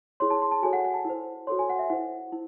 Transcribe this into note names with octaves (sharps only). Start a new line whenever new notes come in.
E4 G#4 C#5 C6
A5
C6
A5
F#4 A4 C#5 G#5
F#5
F#5
A5
E4 C5
F#4 A4 C#5 C6
G#5
F#5
E5
E4 C5 F#5
E4